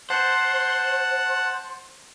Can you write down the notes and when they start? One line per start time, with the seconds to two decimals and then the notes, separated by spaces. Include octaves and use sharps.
0.10 C5 F#5 A5 F#6